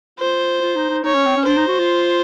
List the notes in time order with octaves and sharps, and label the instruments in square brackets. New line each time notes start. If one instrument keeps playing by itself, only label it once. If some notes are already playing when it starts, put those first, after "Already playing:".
[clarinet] F4 [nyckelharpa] C5
[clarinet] F4
D#4
D#4
[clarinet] D#4 [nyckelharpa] C#5
[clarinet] C#4
C4
C#4
[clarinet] D4 [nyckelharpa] C5
[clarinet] D#4
F#4
F4